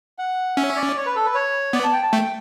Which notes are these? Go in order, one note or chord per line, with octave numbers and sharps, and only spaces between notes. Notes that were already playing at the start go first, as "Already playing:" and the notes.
F#5
C#4 E5
C#5
D5
C#5
B4
A4
B4
C#5
B3 D5
A5
G5
A5
A3 G5